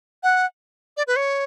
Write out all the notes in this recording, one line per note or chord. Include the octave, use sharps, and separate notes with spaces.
F#5
D5
B4
C#5